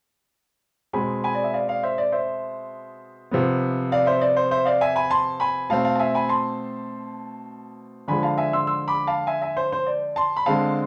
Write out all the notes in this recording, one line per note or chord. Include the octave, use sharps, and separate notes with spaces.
B2 G#3 C4 G#5 B5
G#5 B5
D5
E5
D5 F5
D5 F5
C5 E5
D5
C5 E5
C3 F3 B3
D5 F5
C5 E5
D5
C5
C5 E5
D5 F5
E5 G#5
G#5 B5
A5 C6
G#5 B5
B2 A3 C4 F5 A5
F5 A5
A5
E5 G#5
G#5 B5
A5 C6
D3 F3 G#3 G#5 B5
F5 A5
E5 G#5
C6 E6
C6 E6
B5 D6
F5 A5
E5 G#5
E5 G#5
C5
C5
D5
A5 C6
B5
D3 G#3 C4 F5 A5